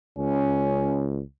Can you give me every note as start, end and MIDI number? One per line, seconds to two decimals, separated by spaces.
0.18 1.21 37
0.18 1.05 61